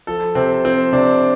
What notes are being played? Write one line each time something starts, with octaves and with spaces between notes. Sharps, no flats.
F3 A4
C3 C4
F3 C4
C3 D4